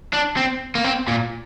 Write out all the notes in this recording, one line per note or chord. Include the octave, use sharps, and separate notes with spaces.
D4
C4
A#3
C4
A#2